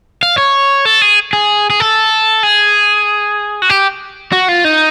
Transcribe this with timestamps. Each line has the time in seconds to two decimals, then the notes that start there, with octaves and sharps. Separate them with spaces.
0.23 F5
0.38 C#5
0.85 A4
1.02 G#4
1.33 G#4
1.70 G#4
1.80 A4
2.43 G#4
3.62 F#4
3.70 G4
4.32 F#4
4.48 F4
4.65 D#4